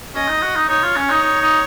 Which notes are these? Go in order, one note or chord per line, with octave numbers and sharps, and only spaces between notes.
C#4 D#5
D#4
F#4
D#4
D#4 C#5
F4
C#4
D#4
D#4
D#4